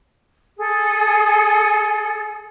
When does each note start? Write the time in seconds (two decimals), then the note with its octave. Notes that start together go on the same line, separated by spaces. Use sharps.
0.57 G#4 A4